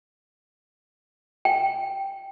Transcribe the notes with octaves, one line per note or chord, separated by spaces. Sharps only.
G5